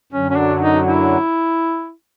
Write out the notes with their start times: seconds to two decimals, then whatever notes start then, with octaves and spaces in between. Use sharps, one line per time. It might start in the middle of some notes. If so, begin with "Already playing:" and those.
0.12 F#2 D3 F#3 C#4
0.30 C#4
0.36 D4
0.62 D#4
0.87 E4